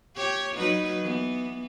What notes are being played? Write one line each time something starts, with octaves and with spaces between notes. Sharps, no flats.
G4 C#5
F#3 D#4 B4
E3 B3